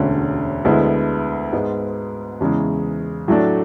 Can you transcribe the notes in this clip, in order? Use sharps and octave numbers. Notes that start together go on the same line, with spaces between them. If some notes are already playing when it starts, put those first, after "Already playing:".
Already playing: E1 D2 D3 A3 C#4
D2 D3 G#3 B3 E4
G#2 G#3 B3
E2 C#3 E3 G#3
A2 F#3 A3 D4